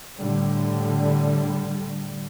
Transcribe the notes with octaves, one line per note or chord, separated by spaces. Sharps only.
A2 D3 G3